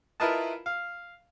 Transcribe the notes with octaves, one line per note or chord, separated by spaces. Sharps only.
E4 F4 A#4 B4 D#5 A5
F5